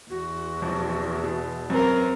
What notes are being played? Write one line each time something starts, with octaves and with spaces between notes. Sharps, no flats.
E2 F#4
B1 F2
B2
F#2 C4 A#4 B4